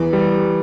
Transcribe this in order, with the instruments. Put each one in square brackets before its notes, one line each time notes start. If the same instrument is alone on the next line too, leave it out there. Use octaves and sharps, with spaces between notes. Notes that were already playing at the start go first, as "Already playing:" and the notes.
Already playing: [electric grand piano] E2 [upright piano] E3
[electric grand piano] G3